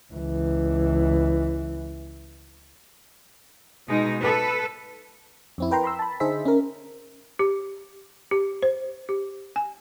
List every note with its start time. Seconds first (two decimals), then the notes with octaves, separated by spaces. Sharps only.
0.13 C#2 E3
3.88 B2 G#3 D#4
4.20 A4 B4
5.58 F2 C4 E4
5.71 A#4 B4 G5 A#5 C6
5.84 B5 C6 E6
5.99 A5 B5
6.20 D3 D#4 G#4 C5 E5 B6
6.45 C#4 A#4
7.39 G4
8.31 G4
8.62 C5
9.09 G4
9.56 G#5